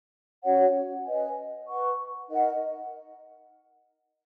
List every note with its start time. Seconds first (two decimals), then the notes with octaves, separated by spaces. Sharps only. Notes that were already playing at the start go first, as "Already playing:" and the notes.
0.44 C#4 F#4 C#5 F#5
1.06 B4 D#5 G#5
1.67 B4 F#5 C#6
2.29 D#4 A#4 D#5 F#5